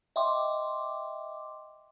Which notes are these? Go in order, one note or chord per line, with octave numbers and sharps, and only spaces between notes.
D#5 E5 G5 C6 D6